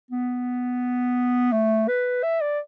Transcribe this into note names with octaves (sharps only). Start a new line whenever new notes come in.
B3
A3
B4
E5
D5